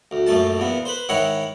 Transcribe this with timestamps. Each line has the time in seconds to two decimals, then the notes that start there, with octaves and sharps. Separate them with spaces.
0.11 D2
0.27 A#1 F#2 A3 A5
0.59 E2 A#2 B3
0.85 B4 C5
1.09 G#2 D#3 E4 C#5 F#5